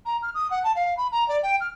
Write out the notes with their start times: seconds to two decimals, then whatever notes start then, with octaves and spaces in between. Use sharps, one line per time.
0.06 A#5
0.23 F6
0.34 D#6
0.51 F#5
0.64 A5
0.76 F5
0.97 B5
1.12 A#5
1.28 D5
1.43 G5
1.61 F6